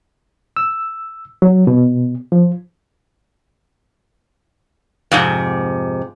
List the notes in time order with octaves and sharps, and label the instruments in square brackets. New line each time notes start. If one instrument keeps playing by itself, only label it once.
[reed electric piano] E6
F#3
B2
F3
[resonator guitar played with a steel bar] F2 G#2 C3